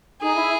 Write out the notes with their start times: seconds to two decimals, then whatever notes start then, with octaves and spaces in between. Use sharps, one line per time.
0.22 D#4 G#4
0.35 E4